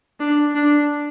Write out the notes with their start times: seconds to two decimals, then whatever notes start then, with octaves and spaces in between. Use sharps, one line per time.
0.20 D4
0.55 D4